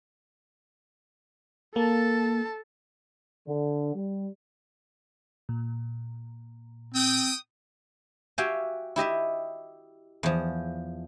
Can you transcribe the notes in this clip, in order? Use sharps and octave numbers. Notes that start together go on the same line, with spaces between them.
A#3 A4 A5
D3
G3
A#2
C4 G5 D#6
F#4 G4 E5 F5 G5 G#5
E4 G4 D#5 E5
E2 F3